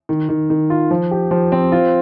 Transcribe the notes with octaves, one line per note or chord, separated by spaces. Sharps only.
D#3
D#3
D#3
F4
F3
G4
F3
C4
F4